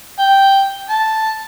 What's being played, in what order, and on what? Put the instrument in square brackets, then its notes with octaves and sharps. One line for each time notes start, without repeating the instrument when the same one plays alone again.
[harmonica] G5
A5